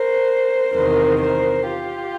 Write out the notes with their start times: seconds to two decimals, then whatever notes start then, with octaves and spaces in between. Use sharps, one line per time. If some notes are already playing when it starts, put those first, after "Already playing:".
Already playing: A#4 C5
0.74 E2 C3 D#3 A#4 C5
1.20 A#4 C5
1.67 F4 G4